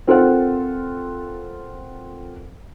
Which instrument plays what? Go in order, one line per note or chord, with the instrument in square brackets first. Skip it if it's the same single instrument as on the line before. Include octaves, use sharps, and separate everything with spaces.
[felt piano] C4 F4 A4 A#4 C5 F#5